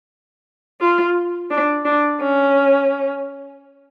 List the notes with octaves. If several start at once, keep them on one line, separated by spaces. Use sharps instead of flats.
F4
D4
D4
C#4